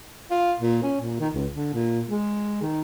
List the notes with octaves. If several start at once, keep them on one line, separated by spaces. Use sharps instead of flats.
F4
A#2
C#4
A#2
D#3
C#2
D3
A#2
G#3
D#3